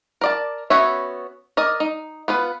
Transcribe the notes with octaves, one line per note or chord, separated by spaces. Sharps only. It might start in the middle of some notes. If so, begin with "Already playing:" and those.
A#4 D5 A5
B3 C#4 F#4 C#5 E5
A#4 D5 D#5
D#4
B3 F4 B4